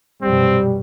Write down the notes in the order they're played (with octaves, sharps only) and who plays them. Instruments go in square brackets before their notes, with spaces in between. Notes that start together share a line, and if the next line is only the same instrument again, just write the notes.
[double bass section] A#1 F#2 B2 [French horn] G3 [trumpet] C4